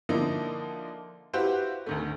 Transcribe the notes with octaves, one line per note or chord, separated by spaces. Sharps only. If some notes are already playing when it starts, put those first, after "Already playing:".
D3 F3 A#3 D#4 E4
E4 F#4 G4 B4 C5 F5
D2 D#3 A3